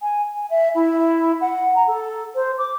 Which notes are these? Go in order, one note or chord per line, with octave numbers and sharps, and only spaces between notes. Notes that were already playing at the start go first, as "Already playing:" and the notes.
G#5
G#5
E5
E4
F#5
A#5
A4
C5
D6